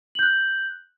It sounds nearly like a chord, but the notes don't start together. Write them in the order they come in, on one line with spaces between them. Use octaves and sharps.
F#7 G6 F#6